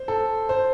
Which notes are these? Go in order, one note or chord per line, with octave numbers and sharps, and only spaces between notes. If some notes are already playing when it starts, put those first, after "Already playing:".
Already playing: C5
A4
C5